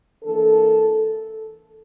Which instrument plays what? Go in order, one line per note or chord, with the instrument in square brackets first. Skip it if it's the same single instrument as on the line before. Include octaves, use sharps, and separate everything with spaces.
[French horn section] E3 A#3 D4 A4